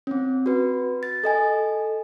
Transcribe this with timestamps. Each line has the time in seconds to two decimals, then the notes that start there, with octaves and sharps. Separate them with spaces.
0.07 C4 C#4
0.46 F#4 B4
1.03 A6
1.24 A4 D#5 G#5